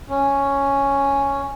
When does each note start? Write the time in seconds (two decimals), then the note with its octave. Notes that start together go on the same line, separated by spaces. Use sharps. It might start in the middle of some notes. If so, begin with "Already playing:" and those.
0.09 C#4